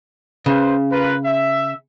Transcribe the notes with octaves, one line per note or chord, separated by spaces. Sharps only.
C#3 B4 C5
F4 A#4 B4
E5